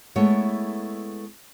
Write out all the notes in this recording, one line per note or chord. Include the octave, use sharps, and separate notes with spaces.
G#3 A3 B3 E4 A4 C#5